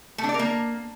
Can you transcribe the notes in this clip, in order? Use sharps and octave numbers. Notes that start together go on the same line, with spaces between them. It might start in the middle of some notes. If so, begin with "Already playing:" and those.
A3
D4
D5
A#4
A#3